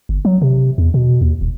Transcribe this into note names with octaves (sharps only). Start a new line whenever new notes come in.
G1
F#3
C3
E2
B2
D#2
D#1